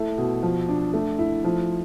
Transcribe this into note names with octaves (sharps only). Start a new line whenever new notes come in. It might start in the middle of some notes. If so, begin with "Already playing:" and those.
Already playing: A3 E4
B2
F3
D4
A3
E4
F3